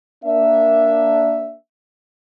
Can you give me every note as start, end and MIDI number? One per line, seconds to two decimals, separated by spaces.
0.24 1.54 58
0.24 1.54 62
0.24 1.54 76